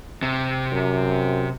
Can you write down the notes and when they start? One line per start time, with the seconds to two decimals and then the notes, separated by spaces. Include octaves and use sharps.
0.22 C3
0.72 F#2